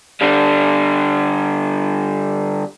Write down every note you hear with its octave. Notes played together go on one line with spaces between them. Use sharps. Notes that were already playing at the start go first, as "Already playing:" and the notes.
D3 G3